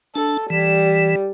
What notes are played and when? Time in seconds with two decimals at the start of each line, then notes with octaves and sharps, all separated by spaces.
0.15 D4 A4
0.50 E3 G3